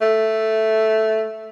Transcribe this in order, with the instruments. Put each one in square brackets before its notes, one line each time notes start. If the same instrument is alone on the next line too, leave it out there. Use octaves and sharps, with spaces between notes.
[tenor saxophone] A3